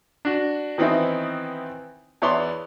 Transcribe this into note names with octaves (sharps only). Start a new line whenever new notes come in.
D4 F#4
D#3 E3 B3 C4 D#4 E4
E2 B3 E4 C#5 D5 C6